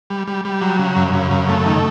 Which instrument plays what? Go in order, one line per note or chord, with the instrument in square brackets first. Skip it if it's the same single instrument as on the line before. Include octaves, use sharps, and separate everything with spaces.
[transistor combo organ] G3
G3
G3
F#3
C#3
F#2
C#3
F#2
A3
D#3